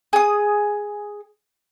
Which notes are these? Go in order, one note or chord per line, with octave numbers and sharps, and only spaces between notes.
G#4 D#6